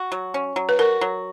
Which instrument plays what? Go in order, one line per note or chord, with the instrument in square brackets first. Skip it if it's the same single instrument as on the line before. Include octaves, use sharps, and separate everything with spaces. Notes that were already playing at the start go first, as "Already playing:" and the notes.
Already playing: [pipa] F#4
F#3
C#4
F#3
[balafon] B4
[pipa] F#4 [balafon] A#4
[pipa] F#3